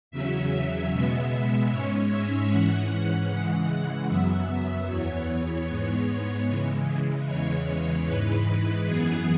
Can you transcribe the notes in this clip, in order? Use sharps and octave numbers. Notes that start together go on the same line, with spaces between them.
E2 C#3 F#3 C#4 E5
B2 G#3 B3
G#2 G#3 C#4 C#5
E5
G#2 E3 C#4 F#5
F#5
C#3 E3 G#3 F#5
F#2 F#3 B3 E5
E2 E3 B3 C#5
G#2 G#3 B3
C#3 E3 G#3
E2 C#3 E3 G#3 C#5
G#2 E3 G#3 B4
F#2 E3 B3 G#4